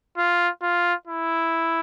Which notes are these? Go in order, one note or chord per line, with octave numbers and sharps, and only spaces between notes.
F4
F4
E4